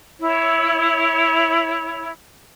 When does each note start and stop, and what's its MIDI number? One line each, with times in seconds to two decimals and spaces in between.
0.19 2.10 64
0.19 2.10 73